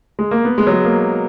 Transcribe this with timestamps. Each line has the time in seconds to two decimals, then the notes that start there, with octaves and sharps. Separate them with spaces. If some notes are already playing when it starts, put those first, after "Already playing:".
0.19 G#3
0.31 A#3
0.45 B3
0.58 G#3
0.67 F#3
0.72 G#3
0.85 A#3